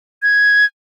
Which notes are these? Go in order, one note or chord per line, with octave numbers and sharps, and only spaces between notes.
G#6